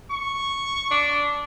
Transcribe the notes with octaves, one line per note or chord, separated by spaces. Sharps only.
C#6
D4